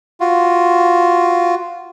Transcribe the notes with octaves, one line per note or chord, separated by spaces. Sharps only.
F4 F#4